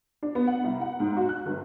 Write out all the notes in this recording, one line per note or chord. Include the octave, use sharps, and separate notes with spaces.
D4
B3
F#5
C2
F#5
G#2
F#4
F#6
G1